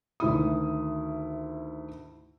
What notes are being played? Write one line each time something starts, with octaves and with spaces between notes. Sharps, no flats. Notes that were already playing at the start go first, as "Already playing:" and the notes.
D2 D#3 E4 D#6